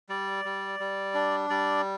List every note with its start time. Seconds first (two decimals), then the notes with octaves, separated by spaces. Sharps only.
0.09 G3 D5
0.45 G3
0.80 G3
1.14 D4
1.50 G3 D5